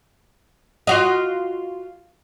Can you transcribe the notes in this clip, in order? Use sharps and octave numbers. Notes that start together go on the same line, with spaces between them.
F4 F#4 D#5